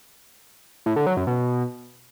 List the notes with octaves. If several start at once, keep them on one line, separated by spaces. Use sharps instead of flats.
A2
D3
F#3
F#2
B2